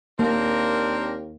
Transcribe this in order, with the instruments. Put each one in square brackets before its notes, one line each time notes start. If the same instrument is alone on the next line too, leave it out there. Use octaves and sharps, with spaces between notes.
[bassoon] D#2 [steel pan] A#3 [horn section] C4 D4 A#4